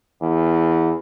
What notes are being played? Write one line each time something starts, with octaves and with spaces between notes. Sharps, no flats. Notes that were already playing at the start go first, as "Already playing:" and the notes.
E2